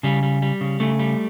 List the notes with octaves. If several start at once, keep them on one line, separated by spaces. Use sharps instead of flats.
C#3 G3
G3
G3
C#3
C#3 A3
G3